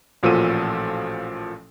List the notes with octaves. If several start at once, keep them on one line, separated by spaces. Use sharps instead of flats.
A1 A#2 F3 F#4 A4 D#7